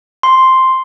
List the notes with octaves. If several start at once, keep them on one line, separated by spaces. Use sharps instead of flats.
C6